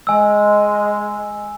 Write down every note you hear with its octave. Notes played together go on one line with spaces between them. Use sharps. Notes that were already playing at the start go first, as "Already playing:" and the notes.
G#3 G#5 E6